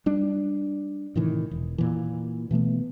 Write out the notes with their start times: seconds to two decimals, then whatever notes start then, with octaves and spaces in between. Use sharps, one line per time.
0.06 G3 D4
1.16 A2 C3 D#3 E3
1.51 E1
1.78 A#2 E3
2.51 B2 E3 A3 B3